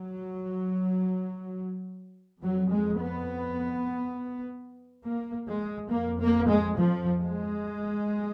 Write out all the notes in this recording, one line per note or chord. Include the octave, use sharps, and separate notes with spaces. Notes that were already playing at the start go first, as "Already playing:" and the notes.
Already playing: F#3
F2 F#3
G#3
B3
A#3
G#3
F2 A#3
A#3
G#3
F3
G#3